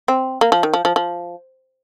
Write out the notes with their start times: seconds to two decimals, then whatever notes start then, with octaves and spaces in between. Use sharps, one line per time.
0.08 C4
0.41 A#3
0.52 F3
0.63 D#3
0.74 F3
0.85 F3
0.96 F3